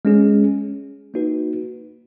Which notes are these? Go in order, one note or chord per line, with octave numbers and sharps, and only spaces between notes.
G#3 C#4 G#4
A#3 D#4 F#4 B4